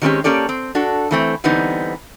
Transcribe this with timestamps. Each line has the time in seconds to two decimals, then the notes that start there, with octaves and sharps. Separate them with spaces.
0.02 D#3 F#3 G#3 C4 C#4 G4
0.24 A#3 C#4 G4 A4 D5
0.49 C4
0.75 D4 F#4 A4
1.11 E3 A3 C4
1.44 D3 E3 G3 B3 C4 D#4